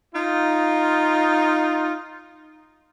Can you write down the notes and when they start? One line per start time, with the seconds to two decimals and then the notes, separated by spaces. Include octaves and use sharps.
0.14 D#4 F4